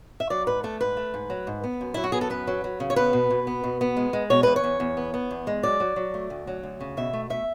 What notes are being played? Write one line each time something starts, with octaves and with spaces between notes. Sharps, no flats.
E5
F#3 D5
G#2 B4
A3 A4
G#2 B4
A3
G#2
F#3
G#2
B3
F#2
F#3 E4
F#4
B3 G#4
A4
F#2 B4
F#3
F#3
C#3
C#5
B3 B4
B2
B2
B3
B2
B3
G#3
G#3
B2 C#5
E2 B4
C#5
E2
E2
B3
B3
E2
G#3
F#3 D5
F#3
F#3
A3
D2
F#3
D2
C#3
B2 E5
A3
A3 E5